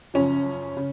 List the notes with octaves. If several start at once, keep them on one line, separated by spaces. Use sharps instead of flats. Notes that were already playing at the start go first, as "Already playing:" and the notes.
F#2 C#3 F3 C#4
C#3